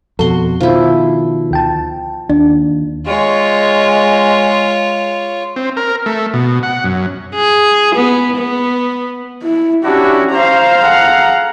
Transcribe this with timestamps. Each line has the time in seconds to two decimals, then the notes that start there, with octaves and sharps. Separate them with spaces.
0.19 F2 B2 F#4 A4 C6
0.60 B2 D#3 F3 E4
1.51 D2 G5 A5
2.29 D#2 D4
3.06 G#3 F4 C#5
5.56 C4
5.77 A#4
6.06 A3
6.34 B2
6.63 F#5
6.84 F#2
7.35 G#4
7.96 B3
8.37 B3
9.43 E4
9.84 C#4 D4 E4 F#4 G4
10.32 C5 F5 A#5
10.82 G#4 A4 F#5